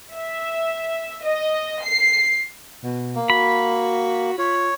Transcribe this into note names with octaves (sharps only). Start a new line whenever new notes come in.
E5
D#5
C7
B2
A#3
F#4 B5
F4 C#5